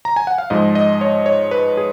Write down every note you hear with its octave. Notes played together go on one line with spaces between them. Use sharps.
A#5
G#5
F#5
F5
G#2 F3 G#3 D#5
D#5
C#5
C#5
B4
G#4